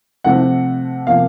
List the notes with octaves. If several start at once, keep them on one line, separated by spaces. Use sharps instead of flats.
C3 F3 A3 C4 F#5
C3 F3 A#3 F5